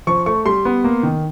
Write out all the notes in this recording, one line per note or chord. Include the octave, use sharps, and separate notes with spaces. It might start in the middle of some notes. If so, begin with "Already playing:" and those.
F3 C#6
A3 C#6
G3 C6
B3
A#3
D#3